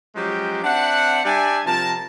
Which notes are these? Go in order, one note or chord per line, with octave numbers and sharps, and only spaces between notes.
F3 F#3 G#3 C#4 G4
C4 D4 E5 F#5
G3 D4 D5 E5 G#5
C3 F3 A#4 A5